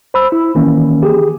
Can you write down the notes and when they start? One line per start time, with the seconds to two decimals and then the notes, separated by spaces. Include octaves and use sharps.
0.14 C5 B5 E6
0.32 E4
0.55 D#3 E3 A#3 C#4
1.03 G4 G#4